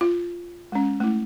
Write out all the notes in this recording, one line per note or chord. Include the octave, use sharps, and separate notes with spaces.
F4
G#3 C#4
A3 E4